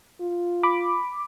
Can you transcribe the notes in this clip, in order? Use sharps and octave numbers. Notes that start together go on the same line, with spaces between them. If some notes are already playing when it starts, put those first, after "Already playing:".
F4
B5 D6